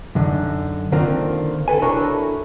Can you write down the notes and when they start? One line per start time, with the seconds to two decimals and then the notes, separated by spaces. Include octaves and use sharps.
0.15 F#2 D3 D#4
0.92 D3 D#3 A#3 C4 F4
1.68 A4 B4 G#5
1.82 D4 E4 F#4 A4 A#4 C#5